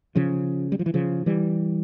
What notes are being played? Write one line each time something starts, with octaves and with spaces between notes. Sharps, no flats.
C#3 F3
G3
F3
E3
C#3 F3
E3 G3